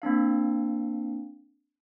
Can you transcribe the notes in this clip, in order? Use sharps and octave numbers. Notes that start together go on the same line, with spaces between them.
A#3 C4 D4 F5